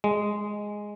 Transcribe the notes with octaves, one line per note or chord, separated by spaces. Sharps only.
G#3